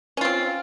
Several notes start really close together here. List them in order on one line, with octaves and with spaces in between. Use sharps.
C#4 F4 C4